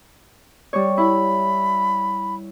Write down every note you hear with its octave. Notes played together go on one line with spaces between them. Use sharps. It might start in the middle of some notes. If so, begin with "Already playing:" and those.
G3 C#5
E4 B5